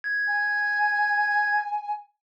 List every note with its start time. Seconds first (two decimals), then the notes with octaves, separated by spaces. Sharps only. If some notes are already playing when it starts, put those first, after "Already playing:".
0.04 G#6
0.27 G#5